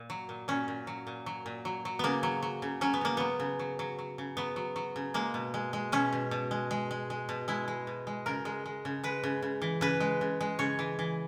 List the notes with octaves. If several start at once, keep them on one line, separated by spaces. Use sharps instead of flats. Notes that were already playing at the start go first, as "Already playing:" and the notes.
Already playing: A#2
F#3
A#2
A#2 C#4
A#2
F#3
A#2
F#3
A#2
F#3
F#3
C#3 A#3 B3
F#3
F#3
C#3
F#3 C#4
B3
C#3 A#3
F#3 B3
C#3
F#3
F#3
F#3
C#3
F#3 B3
F#3
F#3
C#3
G#3 A#3
B2
G#3
G#3
B2 C#4
B2
B2
G#3
G#3
G#3
G#3
B2
G#3 E4
G#3
B2
G#3
C#3 A#4
G#3
G#3
C#3
G#3 B4
C#3
C#3
E3
C#3 B4
G#3
C#3
G#3
C#3 C#5
E3
E3